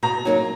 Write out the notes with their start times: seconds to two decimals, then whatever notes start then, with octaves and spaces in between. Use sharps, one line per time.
0.03 B2 A#5
0.25 F#3 A#3 D#4 F#4